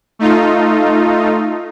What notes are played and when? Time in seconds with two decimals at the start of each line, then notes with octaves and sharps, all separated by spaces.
0.19 A3 D#4 F4